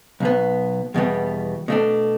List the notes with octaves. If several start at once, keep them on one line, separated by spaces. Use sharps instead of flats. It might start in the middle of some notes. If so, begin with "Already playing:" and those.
B1 B2 B3
E2 B2 G3 B3
B2 A3 D4